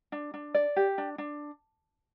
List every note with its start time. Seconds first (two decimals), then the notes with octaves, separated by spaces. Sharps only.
0.12 D4
0.34 D4
0.54 D5
0.76 G4
0.98 D4
1.18 D4